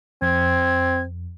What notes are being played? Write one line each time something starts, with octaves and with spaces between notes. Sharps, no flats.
F2 C4 G#6